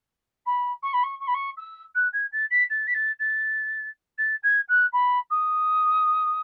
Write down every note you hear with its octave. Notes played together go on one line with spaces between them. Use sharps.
B5
C#6
B5
C#6
C#6
B5
C#6
E6
F#6
G#6
A6
B6
A6
B6
A6
A6
A6
G#6
F#6
B5
D#6